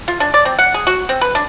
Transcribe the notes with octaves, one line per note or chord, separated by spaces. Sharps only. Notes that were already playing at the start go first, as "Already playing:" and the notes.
F4
D4
D5
C4
F#5
G#4
F#4
C4
B4
D4